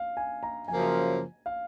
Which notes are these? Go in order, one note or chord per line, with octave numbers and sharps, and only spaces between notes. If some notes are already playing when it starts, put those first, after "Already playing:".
Already playing: F5
G#5
A#5
F#2 C#3 F3 A#3 G#5
F5